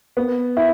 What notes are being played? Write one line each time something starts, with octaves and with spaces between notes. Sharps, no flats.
B3
E4